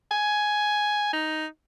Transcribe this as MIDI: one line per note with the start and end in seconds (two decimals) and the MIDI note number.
0.11 1.11 80
1.13 1.46 63